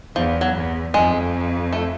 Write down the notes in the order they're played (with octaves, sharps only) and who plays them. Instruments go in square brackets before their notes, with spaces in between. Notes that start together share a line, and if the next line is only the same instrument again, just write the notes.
[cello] E2 [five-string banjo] F3
[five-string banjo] F#3
[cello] E2
[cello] F2 [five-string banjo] G#3
[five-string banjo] A3